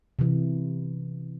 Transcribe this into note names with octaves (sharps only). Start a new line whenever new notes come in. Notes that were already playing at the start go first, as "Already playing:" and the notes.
C3 E3